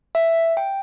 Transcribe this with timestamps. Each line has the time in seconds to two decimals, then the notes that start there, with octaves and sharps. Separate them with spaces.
0.15 E5
0.57 G5